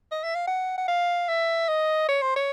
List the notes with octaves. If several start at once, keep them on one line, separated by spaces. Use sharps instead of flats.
D#5
E5
F5
F#5
F#5
F5
E5
D#5
C#5
C5
C#5